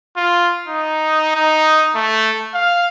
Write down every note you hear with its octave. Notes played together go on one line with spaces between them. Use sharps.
F4
D#4
D#4
A3
F5